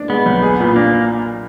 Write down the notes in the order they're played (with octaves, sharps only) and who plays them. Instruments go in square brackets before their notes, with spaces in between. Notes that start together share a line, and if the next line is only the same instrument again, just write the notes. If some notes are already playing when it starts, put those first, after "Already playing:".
Already playing: [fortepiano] D4
[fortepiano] G#3 [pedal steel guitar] B3
[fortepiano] B1
G#4
A#2
[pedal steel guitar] A#3 [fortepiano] D4